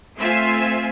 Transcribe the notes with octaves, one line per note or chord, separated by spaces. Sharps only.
A3 C4 F4 E5 G#5